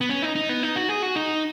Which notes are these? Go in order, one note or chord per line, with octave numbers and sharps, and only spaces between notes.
B3
C#4
D#4
D#4
B3
D#4
F#4
G#4
F#4
D#4